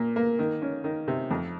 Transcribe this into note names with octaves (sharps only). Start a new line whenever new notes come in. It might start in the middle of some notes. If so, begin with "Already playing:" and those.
Already playing: A#2 A#3
A#3
D#3
C#4
D#3
C3
F2